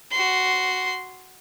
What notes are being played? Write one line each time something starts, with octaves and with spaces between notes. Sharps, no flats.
F#4 C6